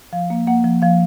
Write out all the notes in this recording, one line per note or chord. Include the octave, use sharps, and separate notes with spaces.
F3 F5
A#3
A#3 F#5
F3
F3 F5